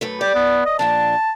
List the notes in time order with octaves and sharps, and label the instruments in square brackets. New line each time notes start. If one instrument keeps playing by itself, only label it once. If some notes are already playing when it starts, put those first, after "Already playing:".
[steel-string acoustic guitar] F#2 A3 B4
[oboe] G4 [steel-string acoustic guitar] D5
[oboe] B3
D#5
[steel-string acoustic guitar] A#2 F3 D4 [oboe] A5